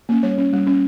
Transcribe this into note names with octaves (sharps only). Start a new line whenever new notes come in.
A#3 C#4
G3 C#5
C#4
G3
C#4